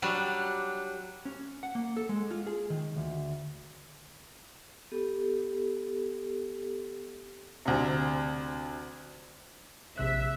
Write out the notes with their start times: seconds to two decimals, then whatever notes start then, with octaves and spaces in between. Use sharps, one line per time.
0.02 F#3 G3 D4
1.25 C#4
1.63 F#5
1.75 A#3
1.97 A4
2.09 G#3
2.31 F4
2.47 G#4
2.70 D#3
2.97 D2
4.92 B3 G4 A4
7.66 D2 C3
9.98 A#1 C3 E5 F#6